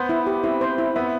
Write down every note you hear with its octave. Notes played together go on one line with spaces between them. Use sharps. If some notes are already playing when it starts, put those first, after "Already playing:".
Already playing: B3 C5
E4
G4
C4 E4
C5
E4
B3 E5